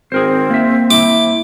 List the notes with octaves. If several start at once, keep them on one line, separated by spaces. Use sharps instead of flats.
G#1 C4 G#4 A#4 C5
A#3 E5
E4 D6